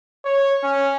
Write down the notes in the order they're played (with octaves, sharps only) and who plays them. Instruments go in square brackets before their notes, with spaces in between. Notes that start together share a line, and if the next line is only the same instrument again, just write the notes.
[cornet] C#5
C#4